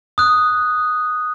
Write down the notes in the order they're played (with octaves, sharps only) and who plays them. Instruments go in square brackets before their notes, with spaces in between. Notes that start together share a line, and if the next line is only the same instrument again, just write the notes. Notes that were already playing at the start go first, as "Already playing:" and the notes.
[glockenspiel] D#6 F#6